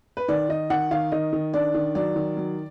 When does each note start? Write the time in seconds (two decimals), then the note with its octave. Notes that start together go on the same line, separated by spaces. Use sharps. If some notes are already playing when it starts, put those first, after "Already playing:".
0.17 B4
0.28 D#3 D5
0.49 D#3 D#5
0.70 D#3 F#5
0.91 D#3 F5
1.12 D#3 D#5
1.33 D#3
1.54 D4 D5
1.74 D#3
1.95 F#3 D5
2.16 D#3
2.37 F#3